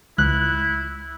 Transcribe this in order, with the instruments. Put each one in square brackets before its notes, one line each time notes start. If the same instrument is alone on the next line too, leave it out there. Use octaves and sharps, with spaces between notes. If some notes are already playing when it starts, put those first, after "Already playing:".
[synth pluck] C#2 [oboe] E4 [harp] F#6